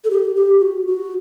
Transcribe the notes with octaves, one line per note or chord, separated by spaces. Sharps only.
A4
G4
G4
F#4
F#4